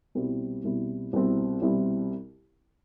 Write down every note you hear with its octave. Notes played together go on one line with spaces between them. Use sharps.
C2 B2 G3 C4 E4
C2 B2 G3 C4 E4
C2 B2 G3 C4 E4
C2 B2 G3 C4 E4